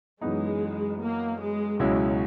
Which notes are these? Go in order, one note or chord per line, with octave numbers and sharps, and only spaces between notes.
F#2 E3 G#3 B3 D#4
A#3
G#3
C#2 B2 F#3 G#3 C#4 E4